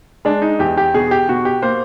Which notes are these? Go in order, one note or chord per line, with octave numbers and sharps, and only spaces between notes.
G#3 D4
D#4
E2 G4
G4
B2 G#4
G4
B2 F#4
G4
A#3 C5